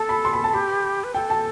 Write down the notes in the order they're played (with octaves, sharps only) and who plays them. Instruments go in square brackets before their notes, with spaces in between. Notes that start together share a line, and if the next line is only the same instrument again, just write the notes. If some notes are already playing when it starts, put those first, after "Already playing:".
Already playing: [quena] A4 [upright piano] A5
[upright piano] B5
C6
B5
A5
[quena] G4 [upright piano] B5
[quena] B4
[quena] A4 [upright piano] G5
[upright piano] A5